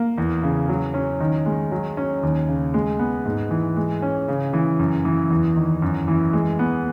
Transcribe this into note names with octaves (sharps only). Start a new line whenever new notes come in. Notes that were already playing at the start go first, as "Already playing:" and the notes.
Already playing: A#3
E2
C#3
F#3
C#4
D#3
G#3
F#3
C#4
D#2
C#3
G#3
B3
G#2
E3
G#3
C#4
C#3
E3
F#2
E3
E2
D#3
F#2
E3
G#3
B3